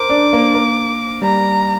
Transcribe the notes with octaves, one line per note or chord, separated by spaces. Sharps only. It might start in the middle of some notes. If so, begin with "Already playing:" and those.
Already playing: A#4 C5 D6
D4
A#3
A#3
G3 A#5